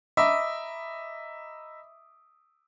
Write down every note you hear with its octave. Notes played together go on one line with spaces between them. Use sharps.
D#5 E5 A#5 B5 D6 D#6